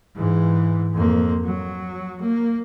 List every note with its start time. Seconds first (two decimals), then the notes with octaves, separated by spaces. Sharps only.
0.16 G#2 E3
0.94 F2 A#3
1.45 F#3
2.22 A#3